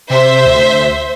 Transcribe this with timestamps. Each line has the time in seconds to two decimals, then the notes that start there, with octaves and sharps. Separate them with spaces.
0.10 C3 C5 E5
0.46 D2